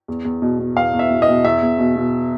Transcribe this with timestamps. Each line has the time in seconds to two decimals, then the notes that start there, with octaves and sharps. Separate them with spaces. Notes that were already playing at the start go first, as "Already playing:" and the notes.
0.08 E2
0.25 E2
0.42 B2
0.59 B2
0.76 E2 F5
0.93 E2
0.99 E5
1.10 B2
1.22 D#5
1.28 B2
1.44 E2 E5
1.62 E2
1.78 B2
1.96 B2